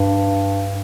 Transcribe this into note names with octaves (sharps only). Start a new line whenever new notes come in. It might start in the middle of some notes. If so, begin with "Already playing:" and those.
Already playing: G2